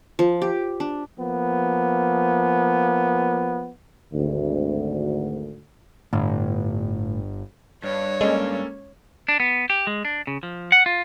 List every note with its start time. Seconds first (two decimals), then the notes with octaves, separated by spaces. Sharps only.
0.19 F3
0.42 G4
0.80 D4
1.19 F3 A#3 B3
4.12 G#1 D2
6.13 G1 A2
7.84 G2 C#5
8.21 G#3 A#3 C#4 A4
9.29 D4
9.40 B3
9.70 G4
9.87 G#3
10.05 D4
10.27 C#3
10.43 F3
10.72 F#5
10.86 F4